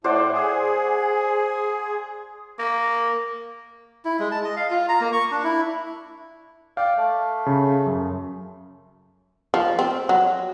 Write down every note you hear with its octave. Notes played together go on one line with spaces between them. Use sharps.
A2 C5 D5 F#5
G#4
A#3
E4
G#3
A5
D#5
F5
F4
A#5
A#3
C#6
D4
E4
D5 F5 G5
A3
C#3
F#2
F3
C4
F#3